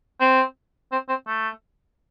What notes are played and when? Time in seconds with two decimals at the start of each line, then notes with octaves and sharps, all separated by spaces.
0.20 C4
0.92 C4
1.09 C4
1.27 A3